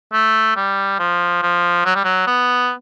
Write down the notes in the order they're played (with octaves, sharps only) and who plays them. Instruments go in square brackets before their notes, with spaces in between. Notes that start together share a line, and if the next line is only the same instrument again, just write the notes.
[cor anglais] A3
G3
F3
F3
F#3
G3
F#3
B3